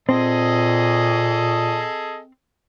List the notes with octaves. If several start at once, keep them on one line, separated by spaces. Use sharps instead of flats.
A#2 C4 G#4 A4 D#5